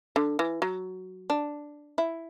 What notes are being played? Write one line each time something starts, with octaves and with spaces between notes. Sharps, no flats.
D3
E3
F#3
D4
E4